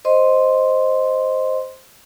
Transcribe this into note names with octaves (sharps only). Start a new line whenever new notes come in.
C5 D#5 C6